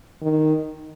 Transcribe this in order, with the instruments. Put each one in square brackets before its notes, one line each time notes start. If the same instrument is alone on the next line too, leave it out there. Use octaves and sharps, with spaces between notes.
[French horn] D#3